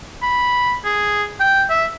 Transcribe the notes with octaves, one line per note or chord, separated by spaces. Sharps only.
B5
G#4
G5
E5